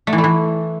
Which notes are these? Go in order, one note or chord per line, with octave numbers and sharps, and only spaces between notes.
A3
E3
A3
E3